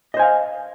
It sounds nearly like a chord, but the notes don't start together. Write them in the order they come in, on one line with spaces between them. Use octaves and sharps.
D#5 C5 G#5 F5